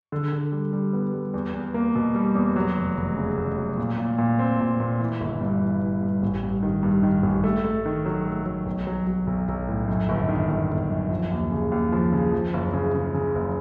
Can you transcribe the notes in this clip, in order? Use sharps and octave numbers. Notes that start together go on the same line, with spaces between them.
D3
D3
G3
G3
B3
G3
E2
E2
A#3
B2
G3
E2
F#3
F1
F1
C#3
F1
F#3
A#2
A#2
A#2
C4
A#2
A#2
E3
G1
G2
E3
E3
G2
A1
G2
D#3
G2
D#3
A1
A3
A3
D#3
F#3
A3
F#3
B1
F#3
F#3
B1
B1
A2
F#2
G1
D#3
G1
G1
F#2
F3
D#2
C#3
D#2
F3
C#3
F3
F#1
C#3
C#3
C#3
F#1